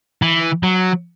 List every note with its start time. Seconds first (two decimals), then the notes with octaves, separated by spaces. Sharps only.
0.22 E3
0.63 F#3